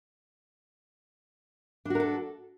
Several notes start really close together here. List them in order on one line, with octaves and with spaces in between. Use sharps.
D4 F#4 A#4 A4